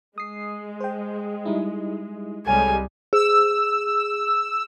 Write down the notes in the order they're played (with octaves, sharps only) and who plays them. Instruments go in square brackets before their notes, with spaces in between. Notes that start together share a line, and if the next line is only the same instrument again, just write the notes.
[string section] G#3 [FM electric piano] D#6 C7
[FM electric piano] C5 G5
G3 D#4 E4
[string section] C2 G3 G#3 [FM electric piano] A4 C#5 F6 [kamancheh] G#5
[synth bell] G#4 [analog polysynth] E6